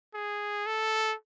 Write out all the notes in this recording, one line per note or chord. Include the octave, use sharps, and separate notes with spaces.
G#4
A4